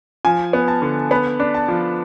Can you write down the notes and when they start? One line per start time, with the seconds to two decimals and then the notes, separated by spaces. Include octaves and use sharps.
0.25 F3 G#5
0.53 B3
0.68 A5
0.82 D3
1.11 B3 B5
1.40 D4
1.54 A5
1.68 F3